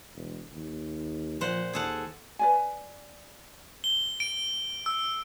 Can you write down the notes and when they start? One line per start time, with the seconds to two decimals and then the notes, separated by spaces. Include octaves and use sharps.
0.15 E1
0.53 D#2
1.41 A#2 F3 C5 F#5
1.73 D#2 G#4 A4 F#5
2.39 B4 D5 G#5
3.84 G7
4.20 D7
4.86 E6